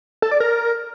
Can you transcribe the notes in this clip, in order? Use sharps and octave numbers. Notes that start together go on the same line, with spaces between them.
A4
D5
A#4